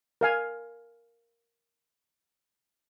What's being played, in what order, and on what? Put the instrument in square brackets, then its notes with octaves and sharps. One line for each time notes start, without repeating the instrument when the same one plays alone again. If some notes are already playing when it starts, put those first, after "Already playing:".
[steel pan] A#4 F5 G#5